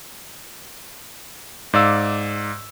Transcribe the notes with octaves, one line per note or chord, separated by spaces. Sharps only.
G#2 D5 F5 E6